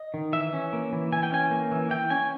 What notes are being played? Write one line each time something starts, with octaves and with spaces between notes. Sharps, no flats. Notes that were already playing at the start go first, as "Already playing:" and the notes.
Already playing: D#5
D#3
E3 E5
C#4
A#3
E3
E3 G#5
G5
C#4 G#5
A#3
E3
E3 G5
C#4 G#5